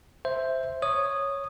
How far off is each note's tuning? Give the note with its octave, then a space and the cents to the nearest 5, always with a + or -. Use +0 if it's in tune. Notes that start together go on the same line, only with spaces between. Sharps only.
C5 +0 E5 +0
C#5 +0 D#6 -10